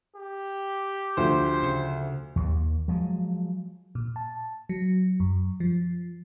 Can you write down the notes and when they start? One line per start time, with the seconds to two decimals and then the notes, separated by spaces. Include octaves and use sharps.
0.16 G4
1.17 D2 F3 C5
1.63 C#3
2.36 D#2
2.88 F3 F#3 G#3
3.95 A#2
4.16 A5
4.69 F#3
5.20 F#2
5.60 F3